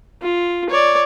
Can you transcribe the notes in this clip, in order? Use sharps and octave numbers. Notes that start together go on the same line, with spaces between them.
F4
C#5 D5